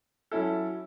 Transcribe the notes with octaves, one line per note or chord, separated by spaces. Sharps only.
F#3 C#4 E4 A4